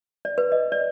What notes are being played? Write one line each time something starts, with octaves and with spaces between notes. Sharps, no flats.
D5
B4
D#5
D5